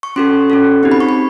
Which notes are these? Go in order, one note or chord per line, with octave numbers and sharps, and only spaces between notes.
C#6
C#4 F#4 A4 C6
C#4 F#4 A4
C4 D#4 G4
B5
C#6
B5